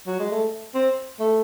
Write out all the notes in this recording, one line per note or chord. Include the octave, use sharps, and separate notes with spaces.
F#3
G#3
A3
C4
A3